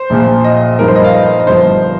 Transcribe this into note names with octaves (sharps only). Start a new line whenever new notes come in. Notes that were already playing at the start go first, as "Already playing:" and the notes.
Already playing: C5
A#1 A#2 F3
D#5
G2 F3 D#4 A#4
C5
D#5
F5
D#5
D#5
G1 G2 F3 C5